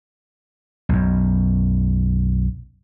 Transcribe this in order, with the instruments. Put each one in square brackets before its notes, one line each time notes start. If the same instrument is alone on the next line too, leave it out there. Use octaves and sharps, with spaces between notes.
[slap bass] B1 F#2